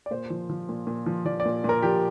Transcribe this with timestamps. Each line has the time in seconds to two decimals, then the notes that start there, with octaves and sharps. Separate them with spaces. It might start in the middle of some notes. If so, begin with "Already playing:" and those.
0.06 D5
0.11 A#2 C5
0.30 F3
0.50 F3
0.69 A#2
0.87 A#2
1.06 F3
1.25 F3 D5
1.40 D5
1.45 A#2
1.64 A#2 A#4
1.83 F3 G4